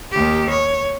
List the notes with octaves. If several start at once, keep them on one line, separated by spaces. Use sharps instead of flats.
D#2 G4
C#5